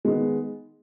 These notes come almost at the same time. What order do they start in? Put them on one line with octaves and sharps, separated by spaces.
G#3 D#3 B3